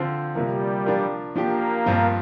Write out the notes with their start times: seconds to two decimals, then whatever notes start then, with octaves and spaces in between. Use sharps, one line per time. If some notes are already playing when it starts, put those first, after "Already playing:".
Already playing: D3 F3 C4 F4 C5
0.35 C3 F3 G3 A#3
0.86 F3 D4 F4 A#4
1.35 F3 A#3 D4 G4
1.86 G2 F3 C4 F4